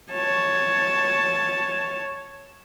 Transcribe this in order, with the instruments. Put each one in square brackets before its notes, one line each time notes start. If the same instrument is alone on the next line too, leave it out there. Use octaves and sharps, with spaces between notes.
[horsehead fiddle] C#5 A5